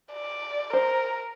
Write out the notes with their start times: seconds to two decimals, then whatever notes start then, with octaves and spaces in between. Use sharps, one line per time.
0.13 D5
0.73 A#4 C5